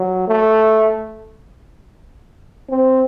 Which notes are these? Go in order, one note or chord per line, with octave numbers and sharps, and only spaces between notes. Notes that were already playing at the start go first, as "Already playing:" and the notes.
Already playing: F#3
A3
C4